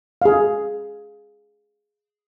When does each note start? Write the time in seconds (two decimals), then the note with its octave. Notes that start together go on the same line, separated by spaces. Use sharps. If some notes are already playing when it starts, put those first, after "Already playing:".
0.22 G#4 F5